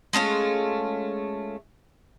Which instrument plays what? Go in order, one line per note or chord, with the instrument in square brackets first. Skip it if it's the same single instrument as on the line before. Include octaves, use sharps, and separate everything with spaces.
[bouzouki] G#3 A3 C#4 F4